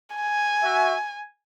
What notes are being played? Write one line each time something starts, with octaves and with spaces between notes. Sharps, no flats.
G#5
F#4 E5